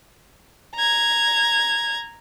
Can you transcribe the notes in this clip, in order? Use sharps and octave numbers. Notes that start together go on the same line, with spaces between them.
A#5 G#6